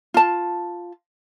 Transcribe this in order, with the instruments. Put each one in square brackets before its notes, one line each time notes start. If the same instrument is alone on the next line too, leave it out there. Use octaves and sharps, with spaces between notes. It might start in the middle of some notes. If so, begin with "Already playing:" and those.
[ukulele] F4 A5